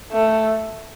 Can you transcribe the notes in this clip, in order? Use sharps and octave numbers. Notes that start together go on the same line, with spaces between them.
A3